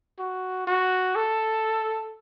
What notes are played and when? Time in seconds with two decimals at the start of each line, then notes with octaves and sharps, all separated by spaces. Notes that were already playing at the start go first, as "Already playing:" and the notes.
0.19 F#4
0.67 F#4
1.16 A4